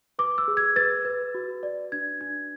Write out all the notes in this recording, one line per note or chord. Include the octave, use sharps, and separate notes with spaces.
B4 D6
E6
G#4
G#6
B4 A6
B4
F#4
D5
D4 G#6
D4 G#6